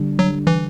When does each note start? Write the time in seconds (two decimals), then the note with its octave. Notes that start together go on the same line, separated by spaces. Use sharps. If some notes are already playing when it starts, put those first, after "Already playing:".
Already playing: D3 G3 D4
0.19 F#3
0.47 E3